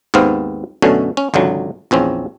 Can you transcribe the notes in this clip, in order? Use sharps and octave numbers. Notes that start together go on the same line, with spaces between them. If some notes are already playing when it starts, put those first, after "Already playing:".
D#2 G#2 B3 C4 F5
F#2 B2 D3 A3 C#4
C#4
G#1 C#2 D3 F#3
A#1 E2 C4 C#4